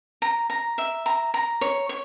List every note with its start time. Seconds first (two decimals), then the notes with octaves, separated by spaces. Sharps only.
0.22 A#5
0.50 A#5
0.78 E5
1.06 A#5
1.34 A#5
1.61 C#5
1.89 C#5